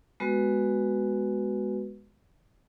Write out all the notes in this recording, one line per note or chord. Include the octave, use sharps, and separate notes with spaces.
G#3 B3 F#4 B4